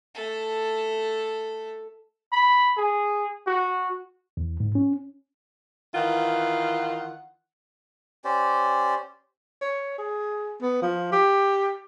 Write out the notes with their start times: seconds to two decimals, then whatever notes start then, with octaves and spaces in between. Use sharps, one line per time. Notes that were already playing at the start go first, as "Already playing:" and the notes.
0.15 A3 A4
2.32 B5
2.77 G#4
3.47 F#4
4.37 E2
4.60 G#2
4.75 C#4
5.95 D#3 E3 F4 F#5
8.25 C#4 G4 C5 D5
9.62 C#5
9.98 G#4
10.62 B3
10.82 F3
11.12 G4